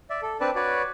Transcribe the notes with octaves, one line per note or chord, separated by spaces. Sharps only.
D5 E5
A4
C4 D4 B4 D5 A5
F#4 B4 C#5 D5